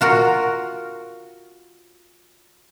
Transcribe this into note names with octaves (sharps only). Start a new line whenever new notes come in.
F4 F#4 A#4